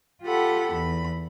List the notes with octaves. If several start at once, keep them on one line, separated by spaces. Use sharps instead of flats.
F4 G4 A4 F#5 B5
E2 B5